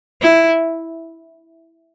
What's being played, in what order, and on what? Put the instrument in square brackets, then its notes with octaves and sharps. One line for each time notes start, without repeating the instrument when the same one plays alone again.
[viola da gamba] E4